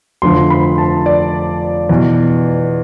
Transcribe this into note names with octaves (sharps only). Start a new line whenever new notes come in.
F1 F2 D3 F3 C6
B5
A5
D5
E2 B2